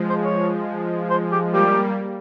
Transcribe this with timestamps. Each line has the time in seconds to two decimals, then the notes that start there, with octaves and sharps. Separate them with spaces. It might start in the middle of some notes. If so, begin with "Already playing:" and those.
Already playing: F3 G#3
0.10 C5
0.24 C#5
1.10 C5
1.32 G4
1.53 G3 A#3 G4